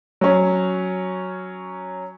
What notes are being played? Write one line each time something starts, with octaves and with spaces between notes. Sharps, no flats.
F#3 C#4